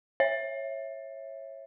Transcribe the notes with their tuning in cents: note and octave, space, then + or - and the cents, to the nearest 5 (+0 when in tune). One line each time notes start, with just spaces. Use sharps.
C#5 -20 E5 +0